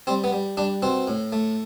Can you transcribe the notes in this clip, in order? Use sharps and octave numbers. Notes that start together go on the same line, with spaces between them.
G3 C4
B3
G3
G3 D4
B2 C4
A2
A3